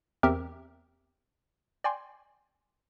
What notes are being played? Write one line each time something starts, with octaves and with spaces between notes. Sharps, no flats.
E2 C4 G4 A#4 E5
D5 G5 G#5 C6